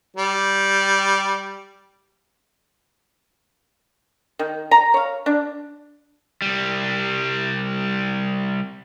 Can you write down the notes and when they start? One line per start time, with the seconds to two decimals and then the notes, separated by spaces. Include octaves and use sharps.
0.17 G3
4.39 D#3
4.71 A#5
4.94 C#5 F5
5.26 D4
6.42 C2 G3